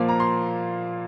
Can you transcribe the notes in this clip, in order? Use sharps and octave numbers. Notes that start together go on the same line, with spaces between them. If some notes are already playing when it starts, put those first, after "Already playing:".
Already playing: A#2 F3 A#3 D6
A#5
C6